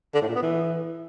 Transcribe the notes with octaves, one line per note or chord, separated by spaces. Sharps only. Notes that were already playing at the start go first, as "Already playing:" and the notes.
D3
A2
A#2
B3
E3